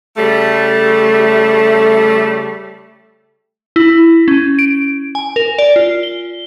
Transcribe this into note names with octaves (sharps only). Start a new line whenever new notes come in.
C#3 G3 A3
E4
C#4
D7
G#5
A#4
D5
F4
G7